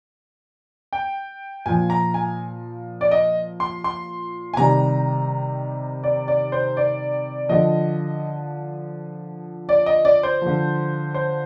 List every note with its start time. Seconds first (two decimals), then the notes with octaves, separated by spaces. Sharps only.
0.93 G5
1.66 A#2 F3 G#5
1.90 A#5
2.14 G#5
3.01 D5
3.11 D#5
3.60 C6
3.84 C6
4.54 G#5
4.57 C3 D#3 G3 A#5
6.03 D5
6.28 D5
6.52 C5
6.77 D5
7.49 D3 F3 D#5
9.69 D5
9.86 D#5
10.05 D5
10.23 C5
10.42 D3 F3
11.14 C5